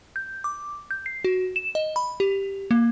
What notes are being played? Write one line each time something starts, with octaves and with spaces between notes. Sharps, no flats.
G6
D6
G6
C7
F#4
E7
D#5
B5
G4
A#3